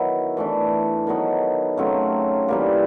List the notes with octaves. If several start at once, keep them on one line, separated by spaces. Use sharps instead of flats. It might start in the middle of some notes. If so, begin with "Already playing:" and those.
Already playing: D#3 F#3 B3 E4
E3 A3 D4
D#3 F#3 B3 D#4
C#3 F#3 A3 C4
E3 G3 A#3